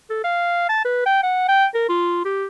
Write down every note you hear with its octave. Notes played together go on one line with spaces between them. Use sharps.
A4
F5
A5
B4
G5
F#5
G5
A#4
F4
G4